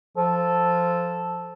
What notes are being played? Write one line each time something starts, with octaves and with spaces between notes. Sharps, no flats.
F3 A4